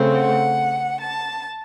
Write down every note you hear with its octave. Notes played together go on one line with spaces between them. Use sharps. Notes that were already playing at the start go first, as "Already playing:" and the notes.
Already playing: C#3 A3 C4
F#5
A5